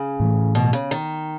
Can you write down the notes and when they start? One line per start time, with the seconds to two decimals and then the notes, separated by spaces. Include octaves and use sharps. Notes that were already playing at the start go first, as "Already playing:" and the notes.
Already playing: C#3
0.20 A2 E3 A3
0.55 B2
0.73 C#3
0.91 D#3